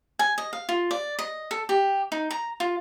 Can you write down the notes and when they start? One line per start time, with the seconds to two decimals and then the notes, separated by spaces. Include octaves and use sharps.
0.19 G#5
0.38 D#5
0.53 F5
0.69 F4
0.91 D5
1.19 D#5
1.51 A4
1.69 G4
2.12 D#4
2.31 A#5
2.60 F4